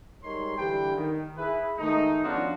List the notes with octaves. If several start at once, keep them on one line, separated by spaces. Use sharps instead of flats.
G3 G#3 D#4 A#4 C#5 C6
D3 E3 G3 G4 B4 G5
D#3
E4 G#4 B4
D#3 G#3 A3 D#4
F3 B3 C#4 D4 F4 F#4